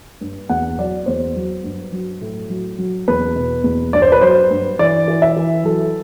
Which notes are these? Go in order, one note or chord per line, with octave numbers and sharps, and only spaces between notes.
G2
E2 F#5
F#3 D5
E2 C5
F#3
G2
F#3
A2
F#3
F#3
E2 B4
B2
E2
G2 D5
C5
B4
F#3 C5
G2
E3 D5
E3
E5
E3
F#3 A4